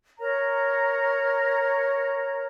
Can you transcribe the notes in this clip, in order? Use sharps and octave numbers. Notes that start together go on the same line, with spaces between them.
A#4 C#5 A#5